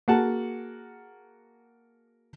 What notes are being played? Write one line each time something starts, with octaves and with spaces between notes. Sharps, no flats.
A#3 F#4 G#4 F#5 A5